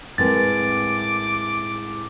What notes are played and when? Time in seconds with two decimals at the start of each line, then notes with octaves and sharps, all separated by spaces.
0.18 A2 G#3 C4 A#4 B4 D6 A6